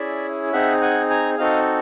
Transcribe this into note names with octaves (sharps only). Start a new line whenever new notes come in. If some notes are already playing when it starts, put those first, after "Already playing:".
Already playing: C#4 E4 G#4 D5 E5
C4 D#4 G#4 E5 F#5
F#5 G#5
G#5 A#5
C4 D#4 F#4 A4 D#5 F5